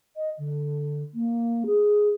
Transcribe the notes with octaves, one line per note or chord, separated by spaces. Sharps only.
D#5
D3
A#3
G#4